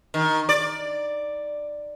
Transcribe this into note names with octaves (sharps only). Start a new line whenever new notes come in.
D#3
D5